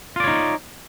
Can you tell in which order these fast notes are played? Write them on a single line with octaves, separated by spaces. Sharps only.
F4 D5 C#5 D#4